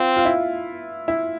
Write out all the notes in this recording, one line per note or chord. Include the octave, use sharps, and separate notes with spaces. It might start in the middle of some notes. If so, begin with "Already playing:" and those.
Already playing: C4 F4
F4
E4
E4